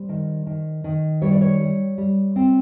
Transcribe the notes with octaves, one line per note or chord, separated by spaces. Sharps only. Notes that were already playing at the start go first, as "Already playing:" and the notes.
Already playing: G3 C5
D#3
D#3
D#3
G3 C#5
D5
C#5
G3
G3
C4